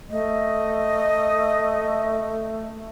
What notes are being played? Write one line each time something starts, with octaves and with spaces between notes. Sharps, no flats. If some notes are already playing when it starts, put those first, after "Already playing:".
A3 D#5